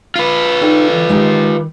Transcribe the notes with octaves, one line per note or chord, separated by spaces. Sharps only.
F4 B4
D#4 A4 D5 G5
E3
D#3 G#3 D#4 G4